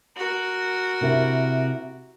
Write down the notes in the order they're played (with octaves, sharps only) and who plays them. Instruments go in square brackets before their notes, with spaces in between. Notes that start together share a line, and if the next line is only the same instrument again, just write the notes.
[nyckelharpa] F#4 A#4
[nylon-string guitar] C3 A#3 E4